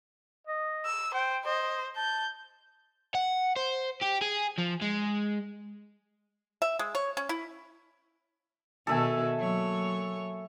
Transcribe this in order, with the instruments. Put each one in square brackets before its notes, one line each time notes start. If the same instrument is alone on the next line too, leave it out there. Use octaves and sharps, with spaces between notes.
[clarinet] D#5
[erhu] E6
[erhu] C5 [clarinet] G5
[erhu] C5 [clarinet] D#5
[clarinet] A5 [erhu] G6
[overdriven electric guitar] F#5
C5
G4
G#4
F3
G#3
[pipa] E5
G#3
C#5
C#4
E4
[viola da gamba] B2 D#3 F#4 [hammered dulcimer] A4 E5 G#5
[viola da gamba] F#3 A#3 C#5